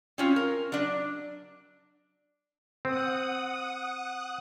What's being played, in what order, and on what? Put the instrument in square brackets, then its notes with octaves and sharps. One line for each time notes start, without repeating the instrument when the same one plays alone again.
[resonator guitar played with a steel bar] C4 C#4 F4
A#4
F#3 D4
[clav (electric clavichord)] C4 [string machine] F#5 D#6